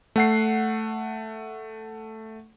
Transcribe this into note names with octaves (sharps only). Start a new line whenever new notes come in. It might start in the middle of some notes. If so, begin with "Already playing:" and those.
A3 F#5 C7